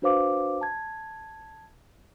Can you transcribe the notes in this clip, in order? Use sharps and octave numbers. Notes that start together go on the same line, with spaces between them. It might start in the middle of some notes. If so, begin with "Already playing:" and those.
D4 F#4 B4 C5 F5 D6
A5 G#6